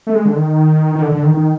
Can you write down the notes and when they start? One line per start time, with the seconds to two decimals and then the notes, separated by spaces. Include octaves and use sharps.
0.07 A3
0.14 G#3
0.25 D3
0.35 D#3
0.96 D#3
1.02 D3
1.12 D3
1.23 D#3
1.34 D#3